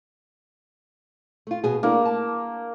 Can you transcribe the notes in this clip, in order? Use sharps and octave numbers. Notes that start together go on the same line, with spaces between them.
A3 F4
B2 G#4
A3 A#3 D4 E4
A5